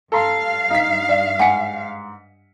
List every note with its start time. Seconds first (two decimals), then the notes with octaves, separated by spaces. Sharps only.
0.12 G2 A4 F5 A#5 C6
0.70 D#4 B6
1.09 D5
1.39 G#2 F#5 G#5 B6 C#7